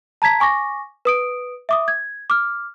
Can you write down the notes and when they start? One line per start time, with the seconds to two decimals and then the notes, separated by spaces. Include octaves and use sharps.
0.22 A5 A#5 G#6 B6
0.40 G#5 C#6 D6 A#6
1.05 B4 D#6 D7
1.69 E5 D6 D#6
1.88 G#6
2.30 D6 F6